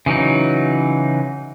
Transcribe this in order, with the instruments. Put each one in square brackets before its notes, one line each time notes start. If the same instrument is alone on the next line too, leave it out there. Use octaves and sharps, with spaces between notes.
[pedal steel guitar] C#3 E3 F#3 D#4